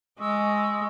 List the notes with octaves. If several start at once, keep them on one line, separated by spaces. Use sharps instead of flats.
G#3 C#6 D#6 E6